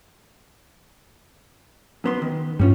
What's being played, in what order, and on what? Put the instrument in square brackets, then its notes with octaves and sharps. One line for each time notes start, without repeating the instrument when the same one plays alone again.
[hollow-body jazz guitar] F#2 B3 C6
D#3
[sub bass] G2 [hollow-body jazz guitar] G3 C#4 F4